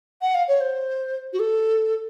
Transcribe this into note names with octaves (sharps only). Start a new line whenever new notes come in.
F#5
F5
C#5
C5
F#4
A4